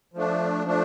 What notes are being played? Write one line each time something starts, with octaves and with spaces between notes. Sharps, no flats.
F3 A3 D4
F3 A3 D4